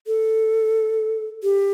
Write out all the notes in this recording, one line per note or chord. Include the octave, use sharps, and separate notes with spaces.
A4
G4